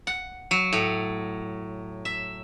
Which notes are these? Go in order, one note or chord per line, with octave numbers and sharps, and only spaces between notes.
F#5
F#3
A2
E5